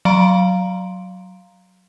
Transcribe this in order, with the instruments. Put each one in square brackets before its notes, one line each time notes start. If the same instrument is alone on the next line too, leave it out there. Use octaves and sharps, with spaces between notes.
[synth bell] F#3 F5 A#5 C6 D7